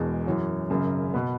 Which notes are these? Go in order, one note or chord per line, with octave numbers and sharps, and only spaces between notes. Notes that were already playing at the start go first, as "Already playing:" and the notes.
Already playing: E1 E2 B2 G#3
F#2 E3 C#4 F#4
G#1 F#2 C#3
B2 B3